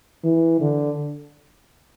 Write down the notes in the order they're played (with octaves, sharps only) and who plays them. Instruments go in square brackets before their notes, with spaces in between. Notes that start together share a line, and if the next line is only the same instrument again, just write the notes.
[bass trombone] E3
D3